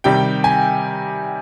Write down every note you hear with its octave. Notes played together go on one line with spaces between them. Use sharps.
C3 D#3 G3 G5
G#5